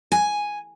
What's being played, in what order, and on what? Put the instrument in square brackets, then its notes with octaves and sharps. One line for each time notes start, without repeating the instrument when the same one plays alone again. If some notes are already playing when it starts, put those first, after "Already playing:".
[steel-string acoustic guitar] G#5